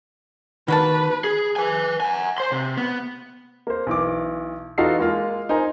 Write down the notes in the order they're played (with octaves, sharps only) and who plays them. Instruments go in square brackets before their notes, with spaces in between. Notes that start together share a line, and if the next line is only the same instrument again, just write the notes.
[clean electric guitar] D#3 [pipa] F#3 A#3 A5 [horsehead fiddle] B4
[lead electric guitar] G#4
B4 G#5
F#5 G#5
C5 C6
C3
B3
[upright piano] A#3 C5
B1 E3 D6
E3 D#4 F4 F#4 A4 C7
G#3 A#3 F4
D#4 A#4 C5 G#5 A#5